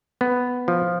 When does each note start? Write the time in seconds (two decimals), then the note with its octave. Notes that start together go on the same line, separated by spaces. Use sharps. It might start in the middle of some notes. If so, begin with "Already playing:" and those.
0.21 B3
0.68 F3